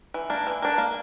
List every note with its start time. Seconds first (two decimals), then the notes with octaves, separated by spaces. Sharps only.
0.14 E3
0.30 A#3 D4
0.47 E3
0.62 A#3 D4
0.78 A#3